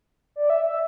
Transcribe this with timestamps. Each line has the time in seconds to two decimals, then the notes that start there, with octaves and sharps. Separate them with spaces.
0.36 D5
0.50 E5
0.64 E5